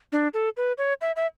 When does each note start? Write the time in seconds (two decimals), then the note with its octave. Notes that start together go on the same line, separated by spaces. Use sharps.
0.12 D4
0.34 A4
0.57 B4
0.78 C#5
1.01 E5
1.16 E5